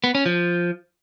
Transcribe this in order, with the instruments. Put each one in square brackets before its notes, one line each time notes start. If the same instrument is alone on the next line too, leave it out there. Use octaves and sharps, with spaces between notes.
[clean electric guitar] B3
C#4
F3